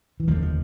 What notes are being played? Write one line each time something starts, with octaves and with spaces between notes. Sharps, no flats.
E3
F1 D#2 D3 F3
F3